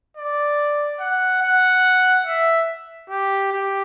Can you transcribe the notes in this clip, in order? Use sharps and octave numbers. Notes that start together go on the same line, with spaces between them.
D5
F#5
F#5
E5
G4
G4